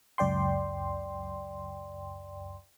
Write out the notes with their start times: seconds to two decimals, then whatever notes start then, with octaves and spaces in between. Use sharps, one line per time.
0.18 C#2 F#2 D5 G5 C6